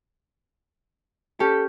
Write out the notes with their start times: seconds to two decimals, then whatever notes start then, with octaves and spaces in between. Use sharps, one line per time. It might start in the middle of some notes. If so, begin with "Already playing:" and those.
1.40 C#4 G4 A4